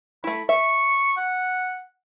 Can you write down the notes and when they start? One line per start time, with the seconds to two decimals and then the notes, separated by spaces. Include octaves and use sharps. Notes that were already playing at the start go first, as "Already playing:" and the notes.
0.24 A3 E4 B5
0.49 E5 C#6
1.16 F#5